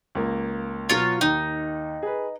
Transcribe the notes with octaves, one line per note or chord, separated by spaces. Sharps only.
C#2 A#3
B2 F#3 F4 C#5
D#2 D#3 D#4
G#4 B4